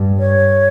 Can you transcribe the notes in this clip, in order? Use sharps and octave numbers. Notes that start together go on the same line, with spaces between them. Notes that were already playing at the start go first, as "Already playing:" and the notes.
Already playing: G2
C#5